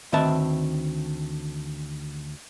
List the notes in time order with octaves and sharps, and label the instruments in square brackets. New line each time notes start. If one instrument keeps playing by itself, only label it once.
[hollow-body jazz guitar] D2 D#3 C4 B4 E5 A5